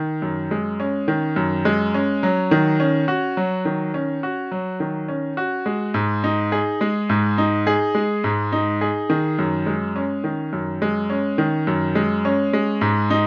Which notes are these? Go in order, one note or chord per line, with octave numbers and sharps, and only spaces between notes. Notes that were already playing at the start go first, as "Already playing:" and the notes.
Already playing: D#3
F#2
G#3
C#4
D#3
F#2
G#3
C#4
F#3
D#3
C#4
F#4
F#3
D#3
C#4
F#4
F#3
D#3
C#4
F#4
G#3
G#2
D#4
G#4
G#3
G#2
D#4
G#4
G#3
G#2
D#4
G#4
D#3
F#2
G#3
C#4
D#3
F#2
G#3
C#4
D#3
F#2
G#3
C#4
G#3
G#2
D#4